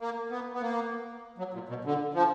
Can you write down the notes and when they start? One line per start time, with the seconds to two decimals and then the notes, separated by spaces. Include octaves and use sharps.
0.01 A#3
0.31 B3
0.53 B3
0.62 A#3
1.38 F#3
1.54 A#2
1.69 B2
1.84 D3
2.14 F3